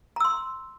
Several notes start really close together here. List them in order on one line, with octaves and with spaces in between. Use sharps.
A#5 E6 C6